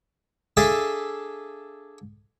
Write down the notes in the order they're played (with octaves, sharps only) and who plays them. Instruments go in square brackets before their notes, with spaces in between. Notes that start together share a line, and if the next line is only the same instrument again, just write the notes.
[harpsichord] D4 G#4 A4 E5 F5 G#5